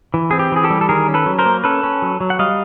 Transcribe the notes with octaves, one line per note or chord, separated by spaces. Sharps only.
E3
C4 G#4
G4
E3 G#4
G4 A4
G3
A4
D#3 G#4 A#4
C#4
A4 B4
F#3
A#4 C5
A#3
C#4 A4 B4
C#4
F#3
F#3
F#5
G3 D#5 F5